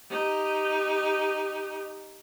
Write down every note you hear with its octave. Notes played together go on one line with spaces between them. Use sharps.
D#4 G4